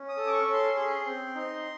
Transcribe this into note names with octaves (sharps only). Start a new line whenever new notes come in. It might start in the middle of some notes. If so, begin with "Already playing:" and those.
Already playing: C#4
D#6
A4
D6
C#6
C#4
C6
G#4 C6
C4
D#4